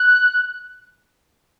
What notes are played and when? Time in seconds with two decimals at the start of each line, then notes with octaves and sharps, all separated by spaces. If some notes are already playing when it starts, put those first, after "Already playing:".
Already playing: F#6